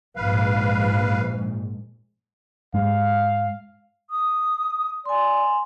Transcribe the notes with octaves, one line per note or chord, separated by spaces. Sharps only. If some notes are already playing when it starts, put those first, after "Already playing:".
A#1 G#2 B4 F5
G#2 G#3 F5
D#6
D5 G#5 C6